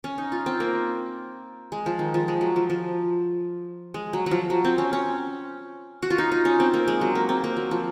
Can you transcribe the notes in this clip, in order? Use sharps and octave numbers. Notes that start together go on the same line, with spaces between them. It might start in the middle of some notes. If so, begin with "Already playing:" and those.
C#4
D#4
F4
C4
A#3
G#3
F3
D#3
F3
G#3
F#3
F3
F3
G#3
F#3
F#3
F3
F#3
C4
C#4
C#4
F#4
F4
D#4
D#4
C#4
C4
A#3
G#3
F#3
A#3
C4
A#3
F#3
F3